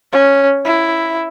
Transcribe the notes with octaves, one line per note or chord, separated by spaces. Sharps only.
C#4
E4